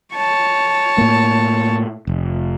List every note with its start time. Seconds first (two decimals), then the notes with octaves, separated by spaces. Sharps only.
0.15 C#5 A5
0.98 A2 A#3
2.07 F1